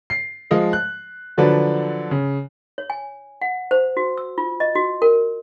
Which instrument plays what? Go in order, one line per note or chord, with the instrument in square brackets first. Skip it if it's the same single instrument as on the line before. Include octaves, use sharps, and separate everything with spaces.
[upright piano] C7
F3 G#3 D#5 F5
F#6
D3 F3 F#3 D4 B4
C#3
[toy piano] C#5
G#5
F#5
C5
F#4
E6
F4
D#5
F#4
A#4